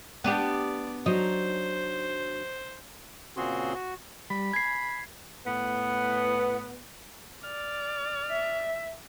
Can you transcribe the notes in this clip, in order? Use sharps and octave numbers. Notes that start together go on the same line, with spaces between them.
B3 D4 G4 D5
F#3 D4 D#4 C5
A#2 C#3 C4 F#4 G#4 C6
F#4
G3 B5
G#5 G#6 C7
A2 B3
D5 F6
E5